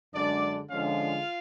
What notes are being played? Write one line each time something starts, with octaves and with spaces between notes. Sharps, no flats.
F#2 D3 G#3 D4 D5
D3 F3 G#3 C#4 F4 F5